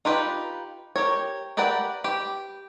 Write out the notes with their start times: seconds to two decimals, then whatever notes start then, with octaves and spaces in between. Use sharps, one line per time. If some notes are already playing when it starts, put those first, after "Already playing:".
0.05 D#4 F4 G4 B4
0.96 G4 A#4 C#5
1.57 G4 A#4 B4 D5 F#5
2.04 G4 B4